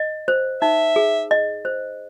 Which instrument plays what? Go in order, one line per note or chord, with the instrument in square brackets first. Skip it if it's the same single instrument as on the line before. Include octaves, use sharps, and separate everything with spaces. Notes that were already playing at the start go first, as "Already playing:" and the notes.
Already playing: [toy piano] D#5
C5
[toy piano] D#4 [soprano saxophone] E5
[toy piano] G#4
D#5
C5